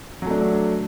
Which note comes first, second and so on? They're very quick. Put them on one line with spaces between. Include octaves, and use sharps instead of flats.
F#3 A3 D4